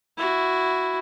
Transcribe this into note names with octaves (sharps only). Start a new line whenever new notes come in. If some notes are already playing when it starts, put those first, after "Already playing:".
E4 F#4